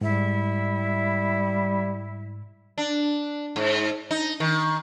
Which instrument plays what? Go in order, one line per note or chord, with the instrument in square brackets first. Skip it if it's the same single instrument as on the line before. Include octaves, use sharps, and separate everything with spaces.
[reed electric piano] G#2 [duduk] G3 [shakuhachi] E4
[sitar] D4
G#2
D#4
D#3